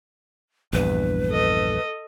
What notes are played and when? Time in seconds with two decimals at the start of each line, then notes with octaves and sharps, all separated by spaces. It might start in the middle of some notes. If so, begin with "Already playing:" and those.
0.73 A#1 E2 G2 B4
1.30 A4 D#5